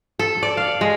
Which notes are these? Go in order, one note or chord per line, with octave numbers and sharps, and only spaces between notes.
A4
D5
F5
G#3